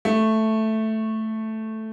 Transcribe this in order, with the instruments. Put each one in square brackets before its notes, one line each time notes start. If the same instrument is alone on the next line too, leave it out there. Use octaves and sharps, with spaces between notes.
[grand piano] A3